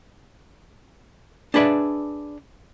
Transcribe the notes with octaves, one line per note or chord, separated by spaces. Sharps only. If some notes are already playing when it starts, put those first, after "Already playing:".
D4 G#4 B4 D5 E5